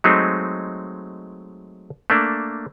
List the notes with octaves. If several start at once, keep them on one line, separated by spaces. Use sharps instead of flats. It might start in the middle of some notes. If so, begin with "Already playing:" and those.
F#3 G#3 A3 C4 D#4
A3 A#3 D4